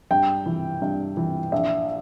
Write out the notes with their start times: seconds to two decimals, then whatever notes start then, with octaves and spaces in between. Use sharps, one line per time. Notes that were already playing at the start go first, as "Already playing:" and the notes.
0.11 G2 G5
0.46 E3
0.82 G2
1.17 E3
1.52 A#1 E5